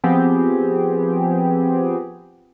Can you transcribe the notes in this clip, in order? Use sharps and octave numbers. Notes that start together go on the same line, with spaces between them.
F3 B3 C4 G4 G#4